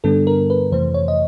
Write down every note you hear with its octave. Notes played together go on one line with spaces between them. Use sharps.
G2 D3 G3 B3 D4 A4
A#4
B4
F2 C3 E3 A3 C5
C#5
D#5